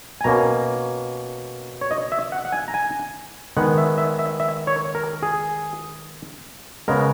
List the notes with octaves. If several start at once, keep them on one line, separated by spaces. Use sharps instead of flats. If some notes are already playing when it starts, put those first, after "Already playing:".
G#5
B2 A#3 C#4 A#5
C#5
D#5
E5
F#5
F#5
G#5
A#5
G#5
D#3 G#3 B3 F#5
E5
E5
E5
E5
C#5
A#4
G#4
C#3 G#3 B3 A#4